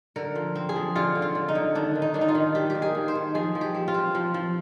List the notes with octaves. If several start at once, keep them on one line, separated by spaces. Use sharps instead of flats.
D3 A#4
F3
C4
G#4
F3
D3 F4
D3
F4
D3
D#4
D3
D#3 D4
D#3
D#4
D#3 D4
D#4
F4
D#3
D4 G4
G4
A#3
G#4
D#3
C5
D#3
F3 G#4
F3
G4
C4
F4
C4
F3
F3